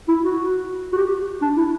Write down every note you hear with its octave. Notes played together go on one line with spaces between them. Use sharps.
E4
F#4
F#4
G4
D4
E4